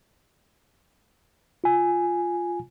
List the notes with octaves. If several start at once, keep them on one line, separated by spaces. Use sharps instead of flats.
F4 G#5